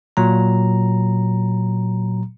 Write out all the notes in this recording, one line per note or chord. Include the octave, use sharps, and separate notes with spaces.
A#2 F#3 A#5